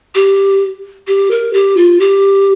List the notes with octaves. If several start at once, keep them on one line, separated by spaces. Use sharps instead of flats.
G4
G4
A#4
G4
F4
G4